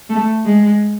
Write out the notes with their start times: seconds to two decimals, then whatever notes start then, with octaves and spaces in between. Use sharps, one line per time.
0.10 A3
0.46 G#3